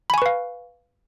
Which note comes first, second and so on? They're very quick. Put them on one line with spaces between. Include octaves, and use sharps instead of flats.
B5 G#5 C#6 B4 F5